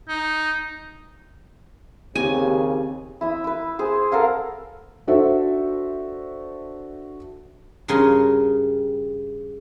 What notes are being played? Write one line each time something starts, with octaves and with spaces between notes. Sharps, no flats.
D#4
D#2 C#3 C4 G4 G#5
E4 E5 D#6
E4 B4
G#4 C5
A4 A#4 F5 F#5
D4 F#4 A4 C5 E5
G2 C#3 A#4 C#5 G#5 C6